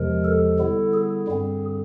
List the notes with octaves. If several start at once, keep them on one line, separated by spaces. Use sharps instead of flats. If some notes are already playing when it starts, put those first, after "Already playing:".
Already playing: E2 C3 F3 G#3 A#4
A4
D3 G3 B3 E4
G#4
G2 D3 G3 C4